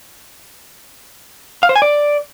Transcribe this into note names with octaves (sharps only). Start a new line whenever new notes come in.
F5
C5
G#5
D5